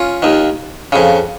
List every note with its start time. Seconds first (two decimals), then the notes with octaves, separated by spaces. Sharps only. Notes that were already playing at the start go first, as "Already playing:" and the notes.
Already playing: C#4 F4
0.22 D#2 D#3
0.92 F2 C#3